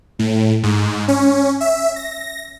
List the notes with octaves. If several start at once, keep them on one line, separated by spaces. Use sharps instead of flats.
A2
G#2
C#4
E5
A#6